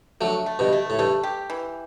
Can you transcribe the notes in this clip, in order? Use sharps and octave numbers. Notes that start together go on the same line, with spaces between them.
F#3 A3 D4
A3
G2 B2
A3
A2
G2 A3
G4
E3